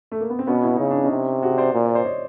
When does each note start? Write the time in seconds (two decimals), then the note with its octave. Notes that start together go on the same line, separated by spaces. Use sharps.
0.12 A3
0.20 A#3
0.30 B3
0.39 C4
0.47 B2 B3 C#4
0.64 E4
0.77 C#3 D#4
0.90 D4
1.04 C#4 D#4
1.11 C3
1.43 F#4 G#4
1.58 C5 D5
1.74 A#2
1.84 C5 D5
1.95 C5 D5
2.05 C#5 D#5